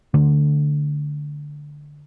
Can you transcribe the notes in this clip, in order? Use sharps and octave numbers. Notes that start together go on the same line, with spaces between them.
D3 A3